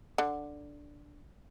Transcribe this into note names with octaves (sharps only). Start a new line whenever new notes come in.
D3